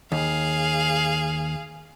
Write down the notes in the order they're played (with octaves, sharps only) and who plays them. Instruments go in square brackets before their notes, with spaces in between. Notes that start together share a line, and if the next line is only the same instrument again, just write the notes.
[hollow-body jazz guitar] D#2 [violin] G#4 F5